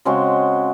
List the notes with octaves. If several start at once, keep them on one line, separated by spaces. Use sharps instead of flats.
C#3 G#3 C4 F#4